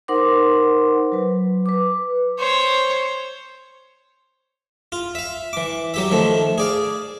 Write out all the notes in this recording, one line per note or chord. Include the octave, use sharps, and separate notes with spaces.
D#4 A#4 C5 F#5 C6 D6
F#3 B4
B4 D6
C5 C#5
F4
E5 F5
E3 D6
F#3 G4 E5
D#3 F3 A3
G#4 D5 F5